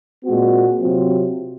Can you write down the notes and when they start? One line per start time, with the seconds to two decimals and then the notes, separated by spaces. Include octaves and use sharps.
0.23 A#2 G#3 C4 F#4
0.80 C3 F#3 C4 F4